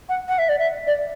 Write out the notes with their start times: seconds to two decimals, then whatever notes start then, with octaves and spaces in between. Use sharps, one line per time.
0.09 F#5
0.28 F#5
0.38 E5
0.49 D5
0.59 E5
0.87 D5